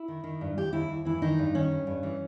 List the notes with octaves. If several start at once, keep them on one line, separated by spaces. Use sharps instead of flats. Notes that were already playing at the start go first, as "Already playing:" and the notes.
Already playing: E4
D#3
D#3
G2
D#2 G4
D#2 E4
D#2
E3 E4
D#3 D#4
G2
D#3 C#4
G2
G2
E3